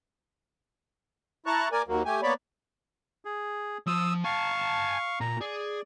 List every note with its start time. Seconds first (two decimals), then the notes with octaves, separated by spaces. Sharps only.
1.46 E4 A5 A#5 C#6 F#6
1.72 A#3 A#4 D5 G#5
1.88 D#2 F#3 A#3
2.05 A3 G4 G#5
2.23 A#3 B3 C#5 D5 B5
3.24 G#4
3.87 F3 C5 D#6 E6
4.24 F5 G#5 A5 C#6
5.21 A#2 A#5
5.41 G#4 D5